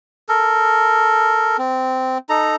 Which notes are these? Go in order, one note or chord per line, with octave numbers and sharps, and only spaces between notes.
A4 A#4
C4
D#4 A4 A#5